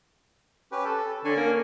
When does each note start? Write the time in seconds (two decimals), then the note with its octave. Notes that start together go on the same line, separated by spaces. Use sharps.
0.72 C#4 G4 B4
0.85 A4
1.25 D3 C#4 G#5
1.37 A#3